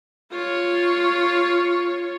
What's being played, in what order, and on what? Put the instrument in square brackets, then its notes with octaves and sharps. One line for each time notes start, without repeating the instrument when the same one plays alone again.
[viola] F4 C#5